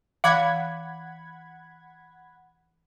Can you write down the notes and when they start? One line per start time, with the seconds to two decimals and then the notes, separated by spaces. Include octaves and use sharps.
0.24 E3 F5 F#5 B5 G#6